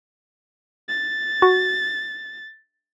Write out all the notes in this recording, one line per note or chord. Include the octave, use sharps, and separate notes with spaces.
A6
F#4